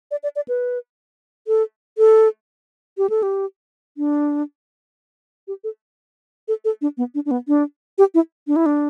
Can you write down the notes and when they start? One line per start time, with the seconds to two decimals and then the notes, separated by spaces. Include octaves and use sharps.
0.11 D5
0.23 D5
0.36 D5
0.48 B4
1.48 A4
1.98 A4
2.98 G4
3.10 A4
3.23 G4
3.97 D4
5.48 G4
5.64 A4
6.48 A4
6.65 A4
6.81 D4
6.97 B3
7.15 D4
7.26 D4
7.31 B3
7.48 D4
7.98 G4
8.14 E4
8.47 D4
8.56 E4
8.66 D4